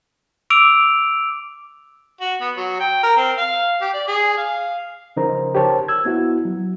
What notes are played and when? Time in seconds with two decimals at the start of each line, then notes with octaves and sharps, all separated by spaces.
0.50 D6 E6 D7 F7
2.21 F#4
2.41 B3
2.56 F#3
2.80 G5
3.03 A#4
3.17 C4
3.37 F5
3.81 G4
3.93 D5
4.08 G#4
4.37 F5
5.16 C#3 F3 D#4 A#4 C5 A#5
5.55 G4 A#4 C5 C#5 A5
5.88 E6 G#6
6.05 B3 E4 F#4
6.45 F#3